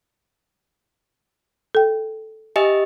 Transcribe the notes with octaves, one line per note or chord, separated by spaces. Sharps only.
A4 G5
G4 D#5 E5 G#5